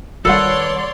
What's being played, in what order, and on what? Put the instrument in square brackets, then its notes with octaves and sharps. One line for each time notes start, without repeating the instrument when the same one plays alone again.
[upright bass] D#3 G3 [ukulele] A4 B4 F#5 [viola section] C#5 D5 C6